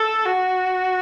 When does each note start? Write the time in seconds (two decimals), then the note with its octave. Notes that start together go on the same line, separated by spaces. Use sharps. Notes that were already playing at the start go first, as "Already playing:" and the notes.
Already playing: A4
0.26 F#4